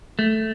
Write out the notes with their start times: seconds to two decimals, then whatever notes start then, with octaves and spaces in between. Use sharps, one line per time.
0.19 A3